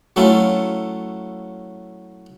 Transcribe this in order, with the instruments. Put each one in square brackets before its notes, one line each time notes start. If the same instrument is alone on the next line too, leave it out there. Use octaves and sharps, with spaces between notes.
[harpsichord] F#3 A3 C#4 E4 F4